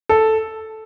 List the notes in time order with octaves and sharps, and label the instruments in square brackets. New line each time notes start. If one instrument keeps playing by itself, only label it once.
[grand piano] A4